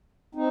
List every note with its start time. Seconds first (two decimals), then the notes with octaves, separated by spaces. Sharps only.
0.35 C4 D#4